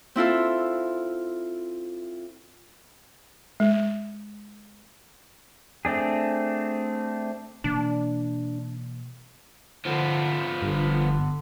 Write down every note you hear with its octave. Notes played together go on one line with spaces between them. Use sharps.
C4 E4 F4 A4
G#3
A3 C4 D4 G#4
B2 E3 A#3 D4
D3 F3 B3
G1 D3